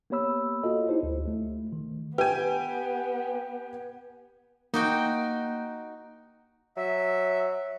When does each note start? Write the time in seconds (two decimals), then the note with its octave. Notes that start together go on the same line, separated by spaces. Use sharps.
0.10 A#3 B3 G4 C#5 B5 E6
0.63 F4 F#4 A4 D#5
0.89 D#4 E4 G4 C5
1.03 D2
1.27 A3
1.73 D#3
2.18 B3 G4 B4 G#5
4.74 A#3 D#4 F#4 G5
6.77 F#3 E5